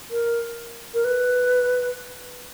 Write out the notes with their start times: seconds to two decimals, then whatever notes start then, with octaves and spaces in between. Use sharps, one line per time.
0.11 A#4
0.94 A#4
1.04 B4